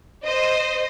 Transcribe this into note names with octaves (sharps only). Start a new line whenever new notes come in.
C5 D#5